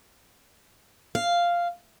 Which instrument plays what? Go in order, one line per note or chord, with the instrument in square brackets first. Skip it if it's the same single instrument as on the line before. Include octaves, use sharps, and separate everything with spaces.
[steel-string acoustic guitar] F5